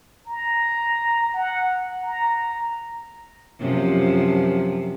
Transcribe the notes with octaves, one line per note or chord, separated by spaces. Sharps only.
A#5
F#5
A#5
F#2 C3 F3